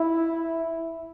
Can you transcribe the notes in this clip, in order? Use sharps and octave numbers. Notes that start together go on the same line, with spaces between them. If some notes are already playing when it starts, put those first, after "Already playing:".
Already playing: E4